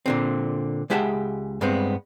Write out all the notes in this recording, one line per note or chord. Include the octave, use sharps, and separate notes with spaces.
A#2 D3 C4
C#2 G#3 G4 E5 F#5 A5
G2 G#3 B3 C4